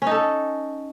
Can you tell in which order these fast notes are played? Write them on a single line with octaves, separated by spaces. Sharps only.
C#4 D#4 A4